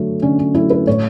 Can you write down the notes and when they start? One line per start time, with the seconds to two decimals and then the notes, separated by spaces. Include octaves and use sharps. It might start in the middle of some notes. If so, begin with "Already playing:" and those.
Already playing: D3 F#3 A3
0.22 D3 C#4
0.39 C#4
0.54 F#3 A3 E4
0.70 B4
0.87 A2 C#5